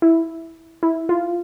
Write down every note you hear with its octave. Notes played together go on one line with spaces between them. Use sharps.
E4
E4
F4